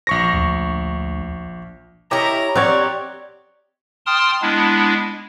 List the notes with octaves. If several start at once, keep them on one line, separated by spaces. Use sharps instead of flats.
A#1 C#6 A#6
D2
E4 G4 A#4 C#5 D#5 A#5
C4 G4 A#4 C#5 D5 F#5
G5 A5 C6 D#6 F6
G#3 B3 D4 E4